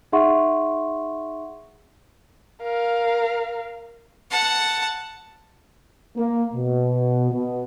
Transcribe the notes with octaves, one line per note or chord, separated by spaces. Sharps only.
D#4 G#4 E5 F#5 C6 C#6
A#4 F5
F#5 A5
A#3
B2
B2